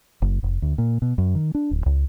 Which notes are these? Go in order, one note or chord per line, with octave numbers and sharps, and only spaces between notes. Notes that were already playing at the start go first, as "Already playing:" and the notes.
F#1
F1
D2
A#2
B2
F#2
D#3
D4
D1
C#2